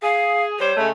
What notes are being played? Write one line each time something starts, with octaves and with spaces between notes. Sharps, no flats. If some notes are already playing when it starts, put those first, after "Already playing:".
G#4 F5
G3 C5 C#5
C#3 G#3 A3